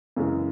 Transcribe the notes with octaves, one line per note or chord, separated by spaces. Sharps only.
F#2 C#3 E3 G#3